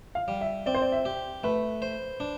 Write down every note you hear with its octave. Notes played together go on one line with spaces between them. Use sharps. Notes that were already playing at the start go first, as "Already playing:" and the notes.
F5
G3
E5
C4 D5
C5
D5
E5
G4
A3 B4
C5
D4